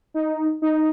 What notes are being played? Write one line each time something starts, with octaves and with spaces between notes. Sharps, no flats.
D#4
D#4